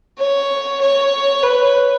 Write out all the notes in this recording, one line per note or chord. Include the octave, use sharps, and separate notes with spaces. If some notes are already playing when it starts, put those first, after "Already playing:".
C#5
C#5
B4